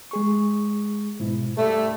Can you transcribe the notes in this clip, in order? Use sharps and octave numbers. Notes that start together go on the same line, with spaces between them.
G#3 G#4 C#6
G#2 B2 E4
G2 A3 A4 E5